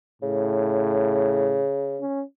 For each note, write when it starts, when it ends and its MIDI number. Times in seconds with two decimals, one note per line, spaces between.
0.22 1.64 45
0.22 2.00 49
2.01 2.22 61